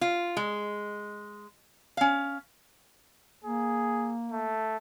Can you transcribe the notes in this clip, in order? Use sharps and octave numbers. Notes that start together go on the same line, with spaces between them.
F4
G#3
C#4 F5
A#3 G#4
A3